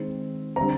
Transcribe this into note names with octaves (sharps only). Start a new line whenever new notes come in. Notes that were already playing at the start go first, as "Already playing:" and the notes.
Already playing: D#3 G#3 C4
D3 G3 C4 A#5